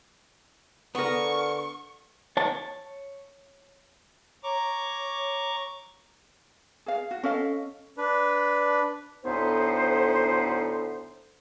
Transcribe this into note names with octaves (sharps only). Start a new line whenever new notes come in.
D3 B3 A#4 C#6
C#5 A5
C#5 A#5 C#6 D6
G#4 F5
F#4
C#4 A4 D#5 F5
D4 B4
D2 A2 B3 D#4 C5